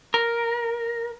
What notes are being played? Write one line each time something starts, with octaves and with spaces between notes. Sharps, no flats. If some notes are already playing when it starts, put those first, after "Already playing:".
A#4